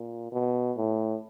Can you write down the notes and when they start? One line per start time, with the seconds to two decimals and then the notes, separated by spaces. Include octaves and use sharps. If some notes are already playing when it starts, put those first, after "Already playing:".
Already playing: A#2
0.32 B2
0.77 A2